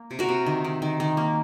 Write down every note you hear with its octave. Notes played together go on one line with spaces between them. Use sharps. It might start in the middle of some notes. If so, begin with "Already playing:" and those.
Already playing: A#3
C3
F#4 A#4
C3
D#3
D#3
D#3
D#3
A#3